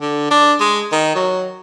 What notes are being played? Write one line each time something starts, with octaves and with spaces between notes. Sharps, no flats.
D3
D4
G#3
D#3
F#3